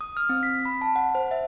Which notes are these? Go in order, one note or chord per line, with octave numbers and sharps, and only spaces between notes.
D#6
F6
C4
B6
B5
A5
F#5
C5
E5